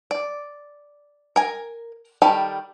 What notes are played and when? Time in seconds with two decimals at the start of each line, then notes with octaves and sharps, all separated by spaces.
0.11 D5
1.36 A#4 G#5
2.22 D#3 G3 A4 A5 B5